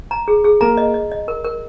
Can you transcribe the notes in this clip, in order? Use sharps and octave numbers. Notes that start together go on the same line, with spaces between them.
A#5
G#4
G#4
A#3 A#4 A#5
D#5
D#5
D#5
A#4
A#4